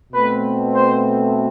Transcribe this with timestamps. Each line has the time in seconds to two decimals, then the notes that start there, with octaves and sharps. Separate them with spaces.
0.13 B2 A3 C4 B4
0.73 C5